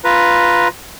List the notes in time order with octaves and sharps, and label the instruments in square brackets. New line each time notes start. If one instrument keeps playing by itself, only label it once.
[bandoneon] F4 B4 A#5